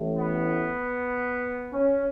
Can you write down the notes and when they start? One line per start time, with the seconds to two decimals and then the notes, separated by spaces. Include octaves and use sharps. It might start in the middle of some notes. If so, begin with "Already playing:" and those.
Already playing: A1 A2 E3
0.15 B3
1.74 C#4